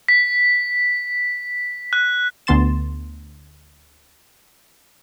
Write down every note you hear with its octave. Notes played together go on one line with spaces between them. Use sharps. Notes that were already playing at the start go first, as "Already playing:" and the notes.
B6
F#6
D2 D3 B3 C6 A6 E7